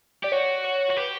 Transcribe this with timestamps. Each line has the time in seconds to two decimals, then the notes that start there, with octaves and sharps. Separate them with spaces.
0.23 G4 D5
0.32 F#4 C#5
0.64 C#5
0.90 F#4
0.97 G4 B4